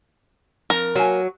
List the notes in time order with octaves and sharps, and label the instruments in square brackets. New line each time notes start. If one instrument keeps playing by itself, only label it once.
[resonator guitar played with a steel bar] F2 [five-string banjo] A#4
[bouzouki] F#3 [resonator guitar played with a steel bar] A#3 G#5